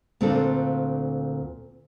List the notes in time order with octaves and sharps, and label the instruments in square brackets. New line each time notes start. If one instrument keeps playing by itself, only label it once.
[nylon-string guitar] D2 A#2 C4 D4 F4 A4